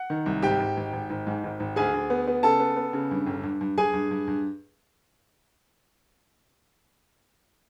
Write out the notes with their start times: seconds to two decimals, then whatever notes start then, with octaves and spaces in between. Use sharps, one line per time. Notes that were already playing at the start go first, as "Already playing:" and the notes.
Already playing: F#5
0.10 D#3
0.26 C2
0.42 G#1 G4 G5
0.60 G#1
0.77 G#1
0.93 G#1
1.10 G#1
1.27 G#2
1.44 G#1
1.60 G#1
1.76 D2 G#4 G#5
1.94 D2
2.10 B3
2.28 B3
2.43 C#3 A4 A5
2.60 B3
2.77 B3
2.93 C#3
3.11 G2
3.27 G1
3.43 G2
3.61 G2
3.77 G2 G#4 G#5
3.93 G2
4.11 G2
4.28 G2